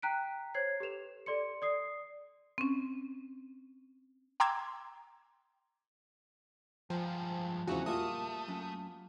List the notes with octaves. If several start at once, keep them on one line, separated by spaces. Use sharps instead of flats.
G5 A#5 F#6 B6 D7
C5 C#5 G#6 C7
G4 A4 B4 E7 F7
A4 D5 C6 C#7
D5 D#6 C7
C4 C#4
G5 A#5 C6 D6 E6 G#6
G2 F3 G#3
E2 C#3 F3 C4 E4 F#4 C5 G#5
A#2 G3 A3 A#3 F4 F#4 E5 D#6
F#2